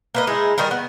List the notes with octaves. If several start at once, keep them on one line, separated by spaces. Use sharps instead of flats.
A#3 B4 D#5
G#3 D#4 E4
D#3 G3 D#4 A#4
B3